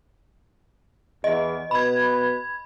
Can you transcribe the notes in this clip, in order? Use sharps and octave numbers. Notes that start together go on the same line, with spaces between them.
E2 D#5
B2 B4 B5 G#6